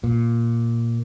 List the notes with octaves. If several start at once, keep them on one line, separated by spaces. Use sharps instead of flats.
A#2